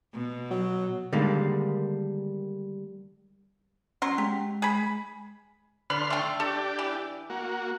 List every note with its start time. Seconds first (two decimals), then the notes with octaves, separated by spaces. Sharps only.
0.13 B2
0.51 F#3
1.13 D3 D#3 G3 G#3 A#3
4.02 F#3 C#4 C6
4.18 G#3 G4
4.62 G#4 B5
5.90 D3 B4 B5 C6 F6
6.10 A3 G5
6.40 D4 G4 A4
6.79 E3
7.30 A#3 F#4